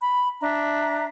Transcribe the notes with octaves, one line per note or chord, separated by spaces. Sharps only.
B5
D4 E5 A#5